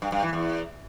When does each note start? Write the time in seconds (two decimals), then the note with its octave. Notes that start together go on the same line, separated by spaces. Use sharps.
0.02 G2
0.12 G2
0.23 E3
0.33 E2